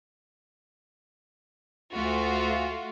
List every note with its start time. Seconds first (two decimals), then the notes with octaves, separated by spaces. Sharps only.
1.93 D2 A3 F4 F#4